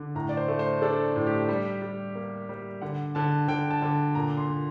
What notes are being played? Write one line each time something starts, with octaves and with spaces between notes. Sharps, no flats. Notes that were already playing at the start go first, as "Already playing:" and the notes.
Already playing: D3
A2 A#5
D5
C5
A3
C5
D4 A4
A2
G4
G3
G3
A#3
G3
D3 F#5
D3 A5
D3 G5
A5
D3
A#2 A#5
C6
A#2